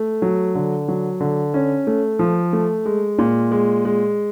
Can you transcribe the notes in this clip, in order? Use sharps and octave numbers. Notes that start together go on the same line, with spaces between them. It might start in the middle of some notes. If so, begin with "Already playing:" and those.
Already playing: A3
F#3
D3
F#3
D3
C#4
A3
F3
A3
G#3
A#2
G#3
G#3